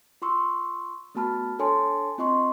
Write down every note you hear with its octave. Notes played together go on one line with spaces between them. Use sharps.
F4 C6 C#6 E6
A3 B3 F#4 A5 B5 F6
D4 A4 C#5 G#5 A5 C6
C4 F4 D#5 C6 C#6